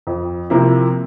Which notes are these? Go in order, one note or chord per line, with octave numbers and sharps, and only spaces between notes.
F2
C3 F3 A#3 E4